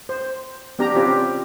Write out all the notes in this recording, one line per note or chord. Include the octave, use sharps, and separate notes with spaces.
C5
B3 D4 G4 A#5
C4 C#4 F4 G4 B4